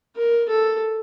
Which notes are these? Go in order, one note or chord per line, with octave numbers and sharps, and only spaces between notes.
A#4
A4